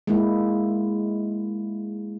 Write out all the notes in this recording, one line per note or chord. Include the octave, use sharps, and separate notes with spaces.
G#3 A#3 E4